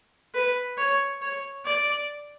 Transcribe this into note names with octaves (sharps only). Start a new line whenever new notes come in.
B4
C#5
C#5
D5